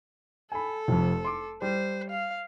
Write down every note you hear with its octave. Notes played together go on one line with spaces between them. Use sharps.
A4 G#5 B5
F1 F2
C6 D6
G3 C5
F5